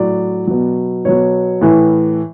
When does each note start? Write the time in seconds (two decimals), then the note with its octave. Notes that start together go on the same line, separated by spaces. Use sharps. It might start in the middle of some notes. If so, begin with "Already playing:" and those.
Already playing: A2 F#3 D5
0.47 B2 F#3
1.05 B2 F#3 C#5
1.61 A2 E3